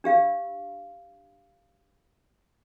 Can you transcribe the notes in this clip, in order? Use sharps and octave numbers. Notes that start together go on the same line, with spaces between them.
D4 G4 F5